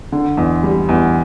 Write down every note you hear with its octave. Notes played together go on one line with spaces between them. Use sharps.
D3
E2
G3
E2